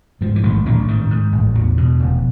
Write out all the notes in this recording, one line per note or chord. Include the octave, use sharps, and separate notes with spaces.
G#2 F3
E3
A1 D#3
A1 D3
G#2 D#3
G#2
A1
E2
B2
F1